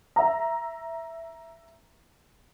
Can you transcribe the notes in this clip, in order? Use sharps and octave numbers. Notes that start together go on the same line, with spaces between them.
E5 A#5